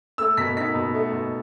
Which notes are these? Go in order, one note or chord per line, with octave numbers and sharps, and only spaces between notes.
A3 E6
B2 B6
D#4 B6
B2
A3
B2